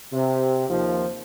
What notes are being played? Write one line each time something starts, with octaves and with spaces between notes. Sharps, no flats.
C3
D#2 F3